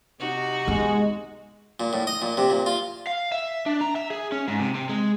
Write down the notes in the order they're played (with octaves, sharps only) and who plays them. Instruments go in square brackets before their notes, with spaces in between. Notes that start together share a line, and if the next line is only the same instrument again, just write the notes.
[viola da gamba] C3 D#4 F#4
[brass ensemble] G#3 [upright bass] B3
[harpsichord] A#2
A2
D#5
A#2
C3
A#2
F4
[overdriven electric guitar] F5
E5
D4
A#5
E5
G#4
C#4
G#2
C3
C3
G#3